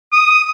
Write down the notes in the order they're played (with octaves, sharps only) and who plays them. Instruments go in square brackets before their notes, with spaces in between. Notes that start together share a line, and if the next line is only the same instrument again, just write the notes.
[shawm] D#6